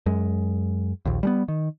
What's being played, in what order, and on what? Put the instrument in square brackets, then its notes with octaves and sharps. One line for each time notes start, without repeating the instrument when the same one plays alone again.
[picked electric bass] F#2 G#3
A#1 D#2
G3 G#3 B3
D#3